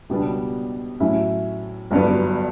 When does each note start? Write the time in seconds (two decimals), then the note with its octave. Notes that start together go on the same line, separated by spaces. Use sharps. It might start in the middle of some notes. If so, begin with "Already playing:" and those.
0.09 C#2 B2 G3 B3 D4
1.00 A2 F#3 C#4 E4
1.91 G1 G2 F#3 B3